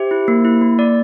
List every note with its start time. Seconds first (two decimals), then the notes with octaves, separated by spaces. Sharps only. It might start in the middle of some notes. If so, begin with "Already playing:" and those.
Already playing: G4 C5 E5
0.11 E4
0.28 A#3
0.45 E4
0.61 A#3
0.78 A#3 D5